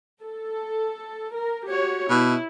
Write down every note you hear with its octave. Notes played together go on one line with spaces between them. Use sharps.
A4
A#4
F#4 G4 C#5
B2 E4